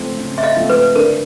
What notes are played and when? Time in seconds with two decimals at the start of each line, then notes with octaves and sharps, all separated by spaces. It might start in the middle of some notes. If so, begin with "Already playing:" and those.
Already playing: C#3 F3 A3 C4
0.18 C#3
0.38 E5
0.43 D#5 F5
0.56 F3 A3 C4
0.70 B4
0.95 D3 A#4